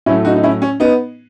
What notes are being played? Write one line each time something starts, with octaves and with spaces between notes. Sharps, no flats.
A2 F#3 A3 C#4 E4
D#4 F#4
D#4
C#4 E4
C#4
B3 D#4